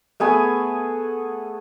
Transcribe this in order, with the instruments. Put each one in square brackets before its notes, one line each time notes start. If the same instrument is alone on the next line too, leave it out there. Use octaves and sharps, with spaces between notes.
[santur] A3 B3 G#4 G#5